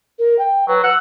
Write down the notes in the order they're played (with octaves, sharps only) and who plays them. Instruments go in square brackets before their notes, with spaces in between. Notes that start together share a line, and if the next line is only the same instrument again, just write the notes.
[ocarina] A#4
G5
[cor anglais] F#3 [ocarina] B4
[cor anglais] F#5 [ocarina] E6